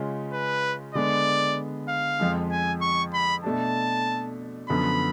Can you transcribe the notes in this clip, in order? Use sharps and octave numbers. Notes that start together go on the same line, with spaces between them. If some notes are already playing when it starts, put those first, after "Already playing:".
Already playing: C#3 G#3 C#4 F4
B4
D3 G#3 B3 D5
F5
F2 F3 G#3
G#5
C#6
B5
B2 A3 D4 A5
F#2 D3 F3 B3 B5